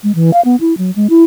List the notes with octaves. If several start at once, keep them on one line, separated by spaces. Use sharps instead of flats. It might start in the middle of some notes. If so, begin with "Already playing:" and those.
G#3
E3
F5
B3
E4
F#3
G#3
E4